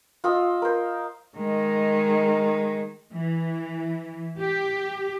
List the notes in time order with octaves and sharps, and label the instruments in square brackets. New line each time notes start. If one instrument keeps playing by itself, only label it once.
[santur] F4 D#5 E6
A#4 C5
[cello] D#3 G#3
[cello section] E3
G4